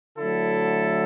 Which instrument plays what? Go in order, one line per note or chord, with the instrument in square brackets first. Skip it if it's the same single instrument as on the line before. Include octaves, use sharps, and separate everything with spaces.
[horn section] D3 F#3 A3 E4 A4